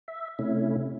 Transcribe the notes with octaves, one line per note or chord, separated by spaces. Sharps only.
E5
C3 A3 C#4 E4